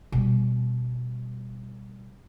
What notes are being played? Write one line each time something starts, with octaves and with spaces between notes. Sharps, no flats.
B2 G3